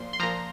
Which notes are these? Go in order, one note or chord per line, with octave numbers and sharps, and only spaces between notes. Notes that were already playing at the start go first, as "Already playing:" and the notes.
Already playing: A#2 F3 C6
C6
A#2 F3 A#5